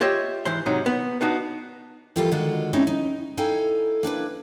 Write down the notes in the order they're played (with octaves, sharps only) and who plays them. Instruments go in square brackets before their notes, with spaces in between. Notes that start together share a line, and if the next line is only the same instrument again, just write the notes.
[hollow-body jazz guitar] F4 G4 C#5 D#5 E5
G#2 E3 C5 C6
G#2 C3 F#3 D#4
B3
B3 D4 D#4 F#4
[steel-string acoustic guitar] E3 G3 A#3 F4 G4 A4
D3 D#3 G#3 F4 F#4 A4
G#3 C4 C#4 D#4 E4 G#4
D#4
D#4 E4 A4 F5 G5 G#5
A#3 D4 E4 B4